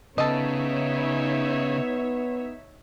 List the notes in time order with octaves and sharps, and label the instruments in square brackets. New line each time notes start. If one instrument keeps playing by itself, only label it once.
[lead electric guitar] C#3 [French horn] B3 [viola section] D#4 C#5 E5 [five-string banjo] A4 D#5